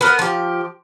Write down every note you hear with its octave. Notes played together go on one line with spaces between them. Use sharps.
B3 A#4
F3 G4